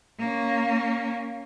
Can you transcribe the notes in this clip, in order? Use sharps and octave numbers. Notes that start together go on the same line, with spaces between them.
A#3 C#4